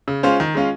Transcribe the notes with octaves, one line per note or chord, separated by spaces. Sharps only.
C#3
G#3 C#4 F4 C5
D#3
G#3 C#4 F4